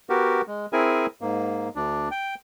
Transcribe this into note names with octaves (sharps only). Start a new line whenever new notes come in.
B3 F#4 G4 A#4
G#3
C4 E4 G#4 A#4 G#5
G#2 A#3
D2 D4
G5